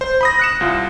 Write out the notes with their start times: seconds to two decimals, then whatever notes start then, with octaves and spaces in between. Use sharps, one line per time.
0.01 C5
0.21 B5 D#6 A#6
0.39 F#6 C#7 E7
0.61 C2 F4